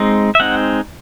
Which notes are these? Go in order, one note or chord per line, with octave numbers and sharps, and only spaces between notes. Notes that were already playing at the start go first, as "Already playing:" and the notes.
Already playing: G#3 C4 D#4
E5
G#3 C4 D#4 F#5